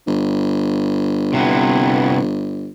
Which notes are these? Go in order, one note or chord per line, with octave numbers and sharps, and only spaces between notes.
G1
C3 E3 B3